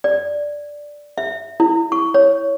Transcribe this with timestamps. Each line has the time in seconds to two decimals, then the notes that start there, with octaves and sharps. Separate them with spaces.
0.04 D5
1.18 E5
1.60 E4
1.92 C#6
2.14 C#5